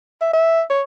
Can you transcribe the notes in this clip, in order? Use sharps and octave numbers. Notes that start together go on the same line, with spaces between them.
E5
E5
C#5